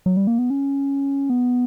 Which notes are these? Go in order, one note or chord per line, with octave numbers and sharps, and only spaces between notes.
F#3
G3
A#3
B3
C#4
B3